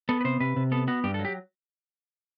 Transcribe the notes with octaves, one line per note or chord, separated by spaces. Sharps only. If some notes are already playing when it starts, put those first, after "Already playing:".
B3 A4
B4
C3 C5
C3 B4
C3
B3 A4
B3 F#4
G2 G4
A4
F#3
G4